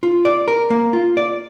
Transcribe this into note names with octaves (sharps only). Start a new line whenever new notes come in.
F4
D5
A#4
A#3
F4
D5